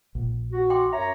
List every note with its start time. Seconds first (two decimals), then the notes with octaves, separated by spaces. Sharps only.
0.15 A#1
0.53 F#4
0.70 G5 C6 D6
0.93 F#2 C#5 E5 A#5